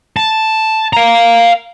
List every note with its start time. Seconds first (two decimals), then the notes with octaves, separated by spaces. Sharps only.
0.17 A5
0.93 F5 A#5